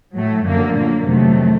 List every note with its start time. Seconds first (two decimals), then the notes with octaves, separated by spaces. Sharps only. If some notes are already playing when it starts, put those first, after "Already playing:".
0.17 A2 F#3 A3
0.47 F#2 D3 F3 A#3
0.78 A#2 F#3 A#3
1.07 F2 C3 D#3 F#3 A3